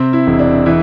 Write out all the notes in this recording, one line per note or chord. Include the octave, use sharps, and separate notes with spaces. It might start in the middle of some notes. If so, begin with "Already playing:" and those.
Already playing: C3 C4
E4
E1
D4
E3 E4